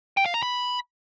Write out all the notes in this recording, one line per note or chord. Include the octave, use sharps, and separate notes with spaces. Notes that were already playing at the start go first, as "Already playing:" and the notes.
G5
F5
A#5
B5